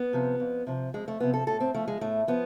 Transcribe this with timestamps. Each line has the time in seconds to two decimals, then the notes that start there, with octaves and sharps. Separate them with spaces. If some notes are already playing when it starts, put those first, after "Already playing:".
Already playing: B3
0.13 C3 F3
0.40 F2
0.67 C3 F3
0.94 F2 G#3
1.08 A3
1.20 C3 F3 B3
1.34 A4
1.47 A2 A4
1.60 C4
1.74 F3 A3
1.88 G#3
2.01 A2 A3
2.28 F3 B3